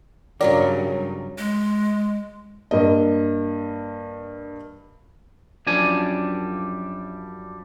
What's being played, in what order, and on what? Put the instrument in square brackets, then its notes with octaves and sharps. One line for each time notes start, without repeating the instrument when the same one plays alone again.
[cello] G2 [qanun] C#3 F#3 A#4 [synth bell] C#5 [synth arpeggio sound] D5
[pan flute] G#3
[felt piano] G2 A#3 D#5
[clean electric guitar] F#2 F3 G3 D4 G#5